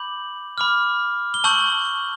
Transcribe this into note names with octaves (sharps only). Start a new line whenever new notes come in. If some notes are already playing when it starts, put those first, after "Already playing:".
Already playing: B5 D6 G6 F#7
B5 D6 F6
G7
A5 C#6 E6 G6 F#7